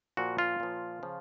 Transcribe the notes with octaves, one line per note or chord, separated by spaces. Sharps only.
A#2 F3 F#4
F4
A#2 F3
C#3 F3